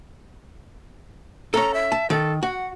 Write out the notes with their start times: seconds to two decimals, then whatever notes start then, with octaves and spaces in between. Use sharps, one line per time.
1.54 C#4 A4 A#5
1.74 E5
1.92 A5
2.10 D#3 A4
2.43 F#4 F#5